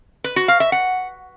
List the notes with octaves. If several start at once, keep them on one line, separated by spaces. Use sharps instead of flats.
B4
F#4
F5
E5
F#5